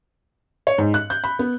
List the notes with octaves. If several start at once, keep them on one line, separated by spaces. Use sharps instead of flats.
C#5
G#2
F#6
G6
B5
B3